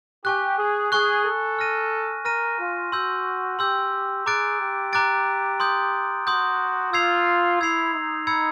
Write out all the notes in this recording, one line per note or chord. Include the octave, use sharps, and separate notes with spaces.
G4 G#5 C#6 F#6
G#4
G#4 G#5 C#6 F#6
A4
F6 A#6 D#7
A#4 F6 A#6 D#7
F4
F#4 C6 E6 G6
G4 C6 E6 G6
G#4 A#5 D6 F#6 A6 D7
G4
A#5 D6 F#6 A6 D7
C6 D#6 G6
F#4 C6 D#6 G6
F4 E6 G#6 C7 F7
E4 E6 G#6 C7 F7
D#4
B5 E6 G#6 C#7